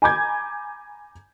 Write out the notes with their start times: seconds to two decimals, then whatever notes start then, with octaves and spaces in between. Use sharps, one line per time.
0.02 G#5 A#5 B5 D6 G6 G#6